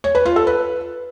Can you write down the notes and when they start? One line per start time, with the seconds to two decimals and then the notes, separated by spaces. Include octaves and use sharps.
0.04 C#5
0.15 B4
0.25 F4
0.36 A4
0.47 B4